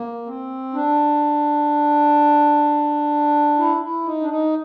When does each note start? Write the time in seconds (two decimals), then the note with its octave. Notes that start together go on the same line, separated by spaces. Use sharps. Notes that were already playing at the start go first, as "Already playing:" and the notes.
Already playing: A#3
0.26 C4
0.74 D4
3.58 E4
3.82 E4
4.06 D#4
4.22 D4
4.30 D#4